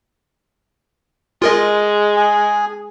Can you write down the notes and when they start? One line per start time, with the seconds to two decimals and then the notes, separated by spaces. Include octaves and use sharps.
1.42 G#3 F4 A#4 D#5
2.16 G#4